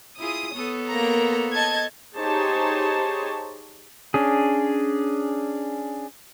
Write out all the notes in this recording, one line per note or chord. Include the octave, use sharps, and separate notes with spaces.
E4 F4 G#4 D#6
B3 A4 C#5
A#3 A#5
D#5 A5 G#6
D#4 G4 G#4 C5 C#5 A5
C#4 D4 G#4